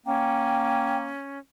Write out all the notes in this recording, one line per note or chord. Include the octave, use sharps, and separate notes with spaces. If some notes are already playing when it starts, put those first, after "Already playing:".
A#3 C#4 G5